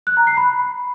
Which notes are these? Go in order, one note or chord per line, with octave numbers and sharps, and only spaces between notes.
F#6
A#5
C7
B5